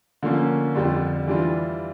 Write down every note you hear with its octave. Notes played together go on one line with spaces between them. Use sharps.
D3 F3 A#3 C#4
F2 D3 G3 D4 F4
E3 G3 D4 F4